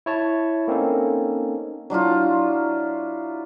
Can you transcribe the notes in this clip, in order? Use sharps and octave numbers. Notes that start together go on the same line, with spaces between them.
E4 C#5 A5
A#3 C4 C#4 D#4 A4
F#3 D4 E4 F4